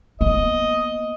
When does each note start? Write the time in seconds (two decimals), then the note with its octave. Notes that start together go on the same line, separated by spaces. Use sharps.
0.21 A#3 B3 D#5